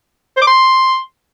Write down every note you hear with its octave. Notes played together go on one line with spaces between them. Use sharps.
C5
D6
C6